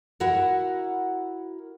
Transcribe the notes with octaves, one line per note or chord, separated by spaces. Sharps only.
E4 F#4 A#4 F#5